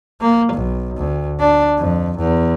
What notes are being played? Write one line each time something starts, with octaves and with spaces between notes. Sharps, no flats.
A#3
B1
D2
D4
F2
E2